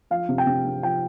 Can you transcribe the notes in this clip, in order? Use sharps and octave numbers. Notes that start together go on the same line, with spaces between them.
F3 F5
C3
G5
C3
C4
F3 G5